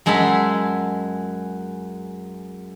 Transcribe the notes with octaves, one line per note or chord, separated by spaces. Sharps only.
F#2 G#3 G#4 E5 A5 B5